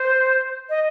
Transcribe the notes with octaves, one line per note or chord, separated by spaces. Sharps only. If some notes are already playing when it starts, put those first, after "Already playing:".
Already playing: C5
D#5